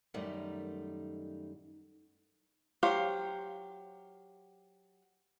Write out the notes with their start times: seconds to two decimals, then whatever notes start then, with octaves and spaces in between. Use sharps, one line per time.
0.14 F#2 D#3 G3 A3 D#4
2.83 F#3 G4 C5 F5